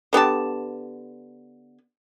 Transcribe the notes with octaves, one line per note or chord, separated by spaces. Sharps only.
D3 B3 G4 A5